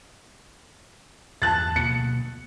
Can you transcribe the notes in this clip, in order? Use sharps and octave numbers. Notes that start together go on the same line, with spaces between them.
E2 G2 A5 F#6 A6
D1 B2 A#3 C#7